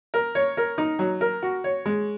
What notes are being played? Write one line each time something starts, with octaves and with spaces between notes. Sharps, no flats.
A#4
C#5
A#4
D#4
F#3
A#4
F#4
C#5
G#3